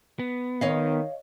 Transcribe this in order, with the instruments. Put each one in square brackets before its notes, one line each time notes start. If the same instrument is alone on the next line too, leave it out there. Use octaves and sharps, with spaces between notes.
[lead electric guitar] B3
[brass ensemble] D#3 [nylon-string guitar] C#5 D#5 F5